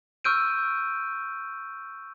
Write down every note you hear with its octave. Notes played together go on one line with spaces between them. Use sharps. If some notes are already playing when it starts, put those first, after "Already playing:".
C#6 E6 F6 G6 D7 D#7